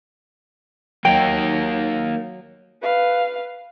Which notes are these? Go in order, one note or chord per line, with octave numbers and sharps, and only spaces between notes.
F#3 A#3 D#4 G5
B4 F5